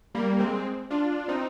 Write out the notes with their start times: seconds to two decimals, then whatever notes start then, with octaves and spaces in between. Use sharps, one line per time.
0.15 G3 A#3
0.39 G#3 C4
0.91 D4 F4
1.28 C4 D#4